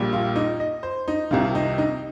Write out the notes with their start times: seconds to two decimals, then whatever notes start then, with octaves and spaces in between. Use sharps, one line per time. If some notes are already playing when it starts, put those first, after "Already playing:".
Already playing: A#1 A#2 G3
0.13 F4
0.36 D#4
0.60 D#5
0.83 C5
1.08 D#4
1.31 C2 C3 D#3 F4
1.55 D#4
1.78 D#4